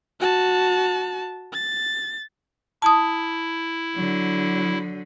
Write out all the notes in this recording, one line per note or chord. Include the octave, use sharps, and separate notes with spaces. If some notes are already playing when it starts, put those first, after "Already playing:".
F#4 A5
A6
E4 A5 D#6
D3 F#3